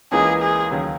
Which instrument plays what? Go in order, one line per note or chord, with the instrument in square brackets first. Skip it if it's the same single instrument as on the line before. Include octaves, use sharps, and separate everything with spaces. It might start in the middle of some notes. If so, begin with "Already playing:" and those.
[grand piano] C#2 C#3 E3 A#3 D#4 [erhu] G#4
[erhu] G#4
[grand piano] D#2 C#3 F#3